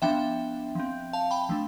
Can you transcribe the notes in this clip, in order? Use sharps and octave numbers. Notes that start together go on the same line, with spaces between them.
F3 B3 D4 E5 G5
F3 C4
F5 A5
G5 B5
F3 A3 D4